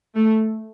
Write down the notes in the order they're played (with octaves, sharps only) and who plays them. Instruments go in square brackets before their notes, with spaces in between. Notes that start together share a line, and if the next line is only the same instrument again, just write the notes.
[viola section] A3